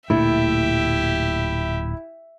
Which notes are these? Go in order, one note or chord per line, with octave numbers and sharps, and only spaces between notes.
D1 A#2 A3 E4 G4 E5